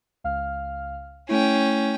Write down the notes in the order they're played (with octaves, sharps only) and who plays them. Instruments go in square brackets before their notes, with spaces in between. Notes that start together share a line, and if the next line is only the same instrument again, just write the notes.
[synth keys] C#2 F5 F6
[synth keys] A3 E4 [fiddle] C#4 G5